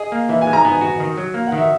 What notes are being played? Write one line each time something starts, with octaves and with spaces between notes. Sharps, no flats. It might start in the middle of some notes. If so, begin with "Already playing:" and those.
Already playing: G#4 D#5
A#3
E3 E5
G#5
G#3
A#5
B3 G#5
F#4
D#3
F#3
A#3
F#5
D#3
E5